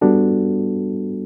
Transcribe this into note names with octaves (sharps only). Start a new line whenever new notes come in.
G3 B3 D4 F#4 A4